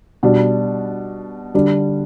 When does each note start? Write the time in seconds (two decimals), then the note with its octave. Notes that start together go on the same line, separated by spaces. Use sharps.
0.23 B2 G3 D4
1.54 D3 G3 D4